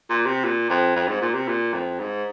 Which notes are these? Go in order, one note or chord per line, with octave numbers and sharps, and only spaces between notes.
A#2
C3
A#2
F2
F2
G#2
A#2
C3
A#2
F2
G#2